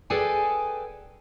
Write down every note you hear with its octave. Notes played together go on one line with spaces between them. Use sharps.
G#4 A4 B4 D5 G5 G#5